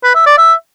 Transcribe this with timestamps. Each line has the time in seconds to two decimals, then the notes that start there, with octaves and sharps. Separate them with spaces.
0.04 B4
0.15 E5
0.26 D5
0.38 E5